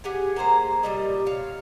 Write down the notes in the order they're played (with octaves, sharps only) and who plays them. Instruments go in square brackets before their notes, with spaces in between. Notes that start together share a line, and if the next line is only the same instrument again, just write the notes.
[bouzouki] G4 G#4 F#5 G#5
A#3 G#4 C5 A#5
A#2 G3 D#5
C#5 F5